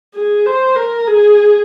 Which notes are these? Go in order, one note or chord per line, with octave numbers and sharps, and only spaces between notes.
G#4
C5
A#4
G#4